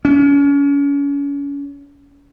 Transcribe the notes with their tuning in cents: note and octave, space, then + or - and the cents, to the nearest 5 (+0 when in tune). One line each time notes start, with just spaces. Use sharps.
C#4 +35